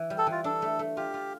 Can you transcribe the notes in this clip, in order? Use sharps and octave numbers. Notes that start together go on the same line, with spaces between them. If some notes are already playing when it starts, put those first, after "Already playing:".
Already playing: E3
G3
A4
E3
F4
D4 A4
A3
A3
F4 G4
F4